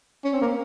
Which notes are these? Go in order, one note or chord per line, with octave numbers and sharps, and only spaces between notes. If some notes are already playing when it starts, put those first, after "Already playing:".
C#4
C4
A#3